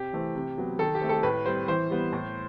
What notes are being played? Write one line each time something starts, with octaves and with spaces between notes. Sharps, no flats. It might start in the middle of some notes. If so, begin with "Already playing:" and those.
Already playing: C3 G4
E3 A3 C4
C3
F#3 B3
D#3 A4
G4
A3 C4
A4
A2 B4
G3 C4 C5
E3 C5
G3 B3
A2